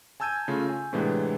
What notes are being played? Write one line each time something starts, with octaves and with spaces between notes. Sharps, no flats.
G#5 A5 E6 G6 G#6 D#7
C#3 A3 F4
G#5
A2 C3 E3 G#3 B3 D4